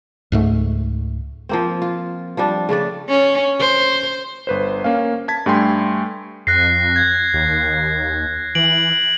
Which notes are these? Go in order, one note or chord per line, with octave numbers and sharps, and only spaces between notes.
C#2 G#2 A3
F3 A#3 C4
F4
F3 G3 D4
C#3 A3 D4 D5
C#4
C5
G1 B4 C5
A#3 C#4 F5
A5 G#6 B6
G2 A3 G4 G5 G#5 C6
F2 F#6 A#6 C7
G#6
D#2
E3 D7 F#7